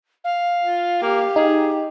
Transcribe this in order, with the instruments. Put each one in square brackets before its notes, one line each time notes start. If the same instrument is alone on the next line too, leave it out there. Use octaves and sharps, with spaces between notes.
[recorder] F5
[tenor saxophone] F4
[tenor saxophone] A#3 [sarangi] G4
[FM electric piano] D#4 [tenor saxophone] G#4